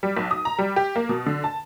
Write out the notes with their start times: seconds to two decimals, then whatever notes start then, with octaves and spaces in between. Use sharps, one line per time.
0.03 G3
0.17 B1
0.31 D#6
0.45 A#5
0.59 G3
0.76 G4
0.96 A#3
1.09 B2
1.26 D3
1.44 A5